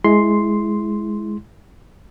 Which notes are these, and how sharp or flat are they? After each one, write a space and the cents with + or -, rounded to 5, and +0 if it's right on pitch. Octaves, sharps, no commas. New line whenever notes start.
G#3 +10 E4 +0 C6 +0